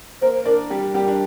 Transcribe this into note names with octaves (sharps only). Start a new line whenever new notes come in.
A#3 A#4 C5
D4 A#4 D5
G3 G4
G3 G4
D4